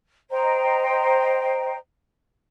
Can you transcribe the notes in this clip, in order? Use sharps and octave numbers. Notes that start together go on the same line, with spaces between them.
C5 D#5 G5 A#5